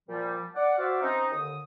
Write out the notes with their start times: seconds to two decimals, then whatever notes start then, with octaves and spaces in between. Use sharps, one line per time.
0.08 A#2 F3 G3
0.55 D5 F#5
0.78 F#4 C5 D5 E5 F5
1.02 C4 C#4 D#4
1.31 D#2 D3 D#6